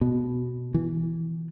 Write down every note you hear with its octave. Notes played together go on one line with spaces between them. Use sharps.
B2
E3